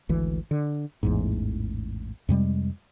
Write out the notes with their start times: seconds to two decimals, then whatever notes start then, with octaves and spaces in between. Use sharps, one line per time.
0.09 G#1 D2 E3
0.51 D3
1.03 A1 E2 G#2
2.29 F2 C3 G3 G#3